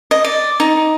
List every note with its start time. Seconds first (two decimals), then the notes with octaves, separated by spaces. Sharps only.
0.11 D#5
0.25 D5
0.60 D#4